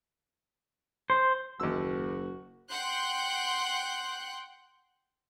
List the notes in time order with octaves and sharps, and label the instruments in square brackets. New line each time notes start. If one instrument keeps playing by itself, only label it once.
[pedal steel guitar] C5
[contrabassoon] F#1 [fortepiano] D#2 E6 [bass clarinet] F#4
[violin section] F#5 G5 C6 F#6 G6